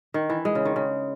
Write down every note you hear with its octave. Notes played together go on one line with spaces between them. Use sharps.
D#3
E3
G#3
C#3
D#3
C#3